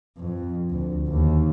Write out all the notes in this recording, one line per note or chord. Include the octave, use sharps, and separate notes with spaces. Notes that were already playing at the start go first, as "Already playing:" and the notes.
F2
D2
D#2